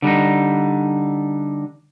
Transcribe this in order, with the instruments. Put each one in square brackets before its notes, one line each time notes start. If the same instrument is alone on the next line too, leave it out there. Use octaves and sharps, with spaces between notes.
[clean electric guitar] D3 G3 D4 D#4